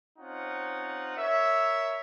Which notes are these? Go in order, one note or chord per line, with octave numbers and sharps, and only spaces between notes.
C4 C#4 D#4 F4 F#5
A#4 C#5 E5